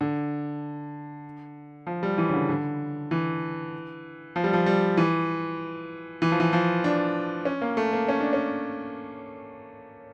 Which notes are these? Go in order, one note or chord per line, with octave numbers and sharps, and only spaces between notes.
D3
F3
G3
E3
C#3
D3
D3
E3
F3
G3
F3
G3
E3
E3
F3
E3
F3
D4
C#4
A#3
A3
A#3
C#4
D4
C#4